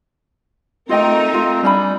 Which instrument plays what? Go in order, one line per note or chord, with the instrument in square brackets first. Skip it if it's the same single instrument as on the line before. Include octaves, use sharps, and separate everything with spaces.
[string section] A3 D#4 A#4 [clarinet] C4 [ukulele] F4 D#5 G5
[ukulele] F4
[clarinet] G3 [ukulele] D4 G#5 B5